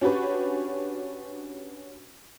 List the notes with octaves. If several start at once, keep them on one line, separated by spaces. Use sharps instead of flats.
C#4 D4 F#4 G4 B4 C#5